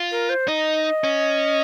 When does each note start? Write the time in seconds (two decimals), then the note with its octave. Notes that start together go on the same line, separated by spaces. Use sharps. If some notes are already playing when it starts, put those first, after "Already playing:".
Already playing: F4
0.11 A#4
0.29 C5
0.48 D#4 D#5
1.04 C#4